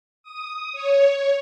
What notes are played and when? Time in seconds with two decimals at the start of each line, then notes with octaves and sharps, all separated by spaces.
0.23 D#6
0.73 C#5